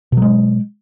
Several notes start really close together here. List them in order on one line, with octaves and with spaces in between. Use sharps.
B2 F#3 G#3